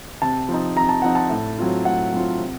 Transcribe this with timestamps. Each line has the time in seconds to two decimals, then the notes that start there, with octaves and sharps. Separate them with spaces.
0.22 C3 A5
0.49 F3 C4 D#4
0.76 C3 A#5
0.89 A5
1.02 F3 C4 D#4 F#5
1.15 A5
1.30 A2
1.58 F#3 C4 F4
1.85 A2 F#5
2.12 F#3 C4 F4
2.39 C3